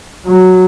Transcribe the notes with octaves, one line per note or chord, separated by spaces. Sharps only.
F#3